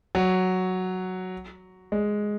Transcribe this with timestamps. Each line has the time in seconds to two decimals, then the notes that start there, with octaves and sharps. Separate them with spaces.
0.15 F#3
1.92 G#3